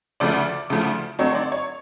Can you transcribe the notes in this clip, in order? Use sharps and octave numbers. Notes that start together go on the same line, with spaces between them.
D2 C#3 F3 A3 D5
D2 C#3 F3 A3
D3 F#3 A3 C4 D#4 C#5
D5
C#5